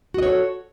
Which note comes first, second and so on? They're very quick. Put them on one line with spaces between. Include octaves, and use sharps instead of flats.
F#4 D#5 C#5 A4